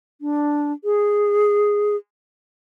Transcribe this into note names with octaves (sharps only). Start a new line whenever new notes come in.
D4
G#4